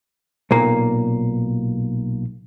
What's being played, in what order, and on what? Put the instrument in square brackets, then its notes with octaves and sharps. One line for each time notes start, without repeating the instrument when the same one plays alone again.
[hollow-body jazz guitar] B1 A#2 A#3